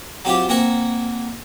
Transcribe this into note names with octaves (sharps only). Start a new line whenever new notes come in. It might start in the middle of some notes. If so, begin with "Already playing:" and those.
F#3 C4 F4 G4
A#3 C4 A#4 F#5 G#5